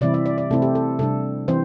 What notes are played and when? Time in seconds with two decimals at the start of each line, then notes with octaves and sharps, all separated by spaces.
0.01 C3 E3 G3 C4 E4 D5
0.14 E5
0.26 D5
0.38 D5
0.50 C3 A3 C4 E4 A4
0.62 G4
0.75 A4
0.99 C3 G3 D4 A4
1.48 E3 C4 C5